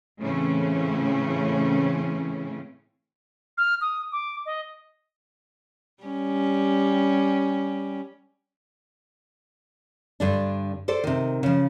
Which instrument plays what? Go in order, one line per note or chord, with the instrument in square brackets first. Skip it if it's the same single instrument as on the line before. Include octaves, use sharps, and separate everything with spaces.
[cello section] A2 C#3 E3 A3 C4 C#4
[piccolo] F6
D#6
D6
D#5
[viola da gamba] G3 C#4
[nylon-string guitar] G2 D3 D4
A4 C5 D5
C3 D#3
C#3 F3